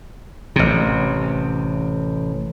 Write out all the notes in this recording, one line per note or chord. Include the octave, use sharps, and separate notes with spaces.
A1 C3